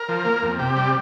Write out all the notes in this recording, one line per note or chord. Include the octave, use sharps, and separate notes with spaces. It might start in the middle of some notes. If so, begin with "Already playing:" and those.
Already playing: A#4
F3
A#3
F2
C3 G4
G3